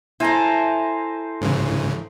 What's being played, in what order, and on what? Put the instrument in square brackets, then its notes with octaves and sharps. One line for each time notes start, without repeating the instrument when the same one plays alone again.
[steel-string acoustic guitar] E4 A4 [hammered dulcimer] C5 G#5 A#5
[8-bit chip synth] G#2 C#3 E3